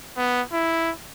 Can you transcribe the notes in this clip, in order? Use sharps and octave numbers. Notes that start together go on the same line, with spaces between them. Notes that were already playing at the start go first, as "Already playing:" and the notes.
B3
E4